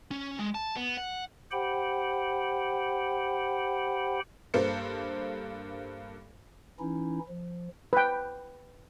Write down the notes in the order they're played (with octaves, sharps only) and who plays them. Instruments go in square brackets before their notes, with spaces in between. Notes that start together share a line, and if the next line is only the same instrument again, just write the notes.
[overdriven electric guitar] C#4
G#3
A5
B3
F#5
[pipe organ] G4 C5 F#5 G5 B5
[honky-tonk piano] G2 A#3 A4 C5 C#7
[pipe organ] E3 C#4 D#4 E4
F3
[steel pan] B4 G5